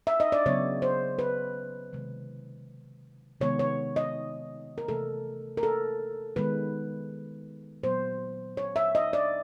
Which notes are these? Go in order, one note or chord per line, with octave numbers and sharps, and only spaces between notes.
E5
D#5
D5
C#3 F#3 B3 C#5
C5
B4
C3 D#3 G#3
C3 D#3 G#3 B3 C#5
C#5
D#5
A#4
C3 E3 A3 A4
A#4
A4
D#3 G#3 B3 B4
A#2 F#3 B3 C5
C#5
E5
D#5
D5